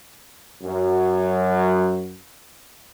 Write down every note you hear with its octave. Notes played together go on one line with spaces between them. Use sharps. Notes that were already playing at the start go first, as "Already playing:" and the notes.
F#2 F#3